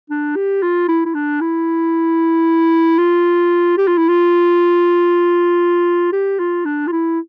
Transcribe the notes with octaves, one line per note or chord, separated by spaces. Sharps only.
D4
G4
F4
E4
E4
D4
E4
F4
G4
F4
E4
F4
G4
F4
D4
F4
E4